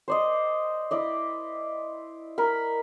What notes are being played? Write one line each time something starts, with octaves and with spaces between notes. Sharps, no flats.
C5 D5 D#5
E4 D5 D#5
A#4 B5